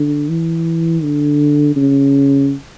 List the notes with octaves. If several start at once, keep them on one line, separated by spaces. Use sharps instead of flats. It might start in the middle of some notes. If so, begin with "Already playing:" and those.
Already playing: D3
E3
D3
C#3